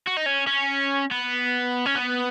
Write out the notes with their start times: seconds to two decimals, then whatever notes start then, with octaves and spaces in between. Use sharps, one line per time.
0.07 F#4
0.17 D#4
0.26 C#4
0.47 C#4
1.11 B3
1.86 C#4
1.95 B3